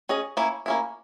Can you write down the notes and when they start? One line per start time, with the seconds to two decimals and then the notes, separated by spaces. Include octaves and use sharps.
0.09 C#4 G#4 D#5
0.37 A#3 C#4 E4
0.66 A#3 C#4 E4